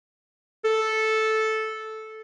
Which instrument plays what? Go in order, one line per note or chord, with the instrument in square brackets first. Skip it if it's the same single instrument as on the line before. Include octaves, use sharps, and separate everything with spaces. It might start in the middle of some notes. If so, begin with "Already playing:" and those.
[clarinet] A4